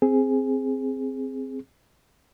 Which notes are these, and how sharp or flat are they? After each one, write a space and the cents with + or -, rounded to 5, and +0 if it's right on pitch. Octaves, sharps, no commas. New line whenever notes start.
C4 +0 G#4 +0